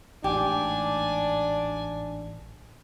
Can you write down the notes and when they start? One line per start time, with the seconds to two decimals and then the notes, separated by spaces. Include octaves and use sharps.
0.24 A1 G#2 D4 G4 G#5